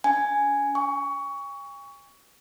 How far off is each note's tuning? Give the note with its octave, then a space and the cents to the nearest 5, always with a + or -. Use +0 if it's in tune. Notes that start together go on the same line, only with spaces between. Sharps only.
C#4 +40 G#5 +0
G#5 -45 C#6 +20